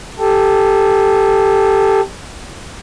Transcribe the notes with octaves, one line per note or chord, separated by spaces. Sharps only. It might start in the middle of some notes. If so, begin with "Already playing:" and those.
G4 A4